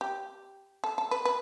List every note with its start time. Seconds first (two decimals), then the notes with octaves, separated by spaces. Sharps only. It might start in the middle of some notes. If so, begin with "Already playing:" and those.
0.01 G4
0.84 A4
0.98 A4
1.11 B4
1.25 B4